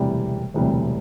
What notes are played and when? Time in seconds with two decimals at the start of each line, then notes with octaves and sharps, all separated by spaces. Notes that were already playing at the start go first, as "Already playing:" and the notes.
Already playing: E1 D2 C3 E3 G3
0.54 E1 D2 C3 E3 G3